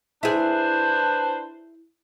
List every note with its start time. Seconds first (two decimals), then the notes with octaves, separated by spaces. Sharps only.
0.23 D4 E4 G#4 B4 C5